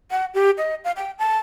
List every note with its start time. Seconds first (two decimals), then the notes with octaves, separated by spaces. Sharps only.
0.11 F#5
0.34 G4
0.58 D#5
0.84 F5
0.96 G5
1.19 A5